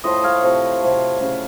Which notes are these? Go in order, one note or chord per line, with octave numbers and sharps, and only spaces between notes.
A2 F3 A3 C5 D#5
C#5 F5
C3 F3 A3
C3 F#3 A3
C#3 A3